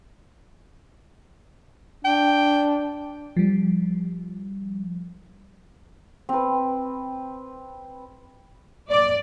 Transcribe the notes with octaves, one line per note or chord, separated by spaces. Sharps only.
D4 G5
F3 G3
C4 B4
D5